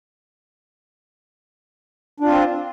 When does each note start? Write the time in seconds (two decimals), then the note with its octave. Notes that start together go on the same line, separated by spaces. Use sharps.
2.20 D4
2.24 F4
2.28 C4